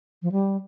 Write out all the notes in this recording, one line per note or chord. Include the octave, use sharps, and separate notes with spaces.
F3
G3